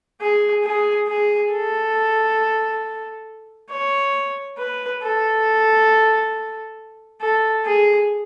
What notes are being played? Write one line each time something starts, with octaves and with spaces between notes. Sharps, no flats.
G#4
G#4
G#4
A4
C#5
B4
A4
A4
G#4